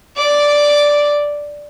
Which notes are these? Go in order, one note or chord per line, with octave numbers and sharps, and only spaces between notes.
D5 D6